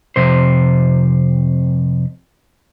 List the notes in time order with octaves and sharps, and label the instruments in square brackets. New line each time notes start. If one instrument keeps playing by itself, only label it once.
[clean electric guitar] F2 C3 C5